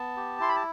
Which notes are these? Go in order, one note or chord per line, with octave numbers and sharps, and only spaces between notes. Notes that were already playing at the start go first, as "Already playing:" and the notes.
Already playing: B3 A5
G4
E4 C6
B5
A5